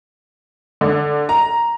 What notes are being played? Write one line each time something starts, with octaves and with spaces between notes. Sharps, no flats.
D3
A#5